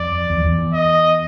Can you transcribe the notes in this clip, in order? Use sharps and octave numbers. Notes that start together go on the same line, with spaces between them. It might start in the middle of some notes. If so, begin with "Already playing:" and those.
Already playing: F2 D5
E2
F2
E2
D#5